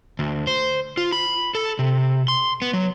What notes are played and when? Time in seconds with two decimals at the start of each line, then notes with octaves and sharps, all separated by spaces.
0.19 D2
0.47 C5
0.97 F4
1.12 B5
1.55 A4
1.79 C3
2.28 C6
2.62 B3
2.73 F#3